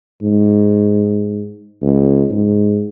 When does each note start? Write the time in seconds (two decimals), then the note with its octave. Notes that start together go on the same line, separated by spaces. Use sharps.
0.22 G#2
1.82 C#2
2.30 G#2